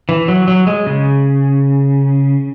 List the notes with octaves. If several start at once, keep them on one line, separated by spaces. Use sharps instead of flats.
E3
F#3
F#3
G#3
C#3